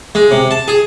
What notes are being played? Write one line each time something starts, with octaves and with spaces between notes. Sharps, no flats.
G#3
C3
A5
G#4